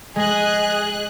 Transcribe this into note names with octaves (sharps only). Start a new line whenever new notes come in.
G#3 G#4 D#5 F#6